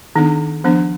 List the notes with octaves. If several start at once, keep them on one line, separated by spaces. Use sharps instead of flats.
D#3 B3 D4 D#4
F3 B3 D4